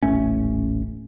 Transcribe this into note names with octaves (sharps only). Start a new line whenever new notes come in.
D#1 A1 A3 C#4